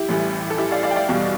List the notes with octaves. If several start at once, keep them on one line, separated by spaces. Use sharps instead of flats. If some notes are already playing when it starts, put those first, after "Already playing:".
Already playing: E4 G4
A1 A2 E3 G3
A4
E4 G4
D5 F5
D5 F5
G5
D5 F5
E2 B2 G3